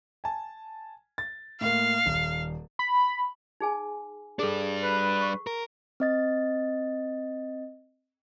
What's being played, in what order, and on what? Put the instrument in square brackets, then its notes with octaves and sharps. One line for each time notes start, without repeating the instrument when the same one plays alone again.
[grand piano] G#5 A5
A6
[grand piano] A2 A#3 [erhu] F5
[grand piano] D#1
[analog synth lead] B5
[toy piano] D#4 G#4 G#5
[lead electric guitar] G3 D4 [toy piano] G#4 A4
[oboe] B4
[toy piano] C#6
[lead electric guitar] A#4
[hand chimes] C4 D#5 A6